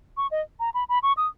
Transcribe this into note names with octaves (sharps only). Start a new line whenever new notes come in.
C#6
D#5
A#5
B5
B5
C#6
D#6